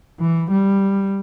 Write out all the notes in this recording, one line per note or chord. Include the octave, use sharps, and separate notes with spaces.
E3
G3